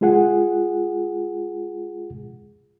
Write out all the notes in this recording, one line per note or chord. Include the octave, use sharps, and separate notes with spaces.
G#3 F4 G#4 F#5